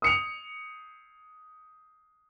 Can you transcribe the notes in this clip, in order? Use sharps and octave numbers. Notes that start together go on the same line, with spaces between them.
D#6 C#7 F7